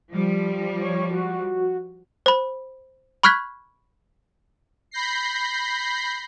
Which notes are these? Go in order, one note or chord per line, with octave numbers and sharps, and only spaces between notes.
F3 G3
C#5
F#4
C5 B5
B5 C#6 F6 F#6 G#6 B6
B5 G6 A#6 C7